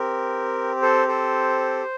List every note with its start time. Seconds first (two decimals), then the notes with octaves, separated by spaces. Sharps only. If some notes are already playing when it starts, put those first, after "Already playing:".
Already playing: C4 G4 A#4
0.82 A4 C5
1.08 A4 C5